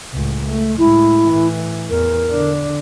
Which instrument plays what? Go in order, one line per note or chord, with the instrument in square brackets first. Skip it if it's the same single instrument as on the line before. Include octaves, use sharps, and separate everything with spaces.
[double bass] C#2 A2
A3
[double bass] A2 G#3 [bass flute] E4
[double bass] A2 E3
[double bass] E2 [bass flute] A#4
[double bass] D3 D4